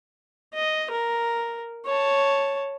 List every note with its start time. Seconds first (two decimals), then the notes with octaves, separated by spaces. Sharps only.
0.54 D#5
0.91 A#4
1.86 C#5 A5